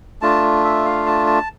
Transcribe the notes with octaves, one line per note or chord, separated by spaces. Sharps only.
A3 D4 F4 A5
E5
F5
A5
A5